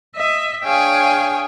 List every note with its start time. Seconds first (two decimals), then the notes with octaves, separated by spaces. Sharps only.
0.15 D#5 E5
0.64 D4 G#4 C#5 F5 G5 G#5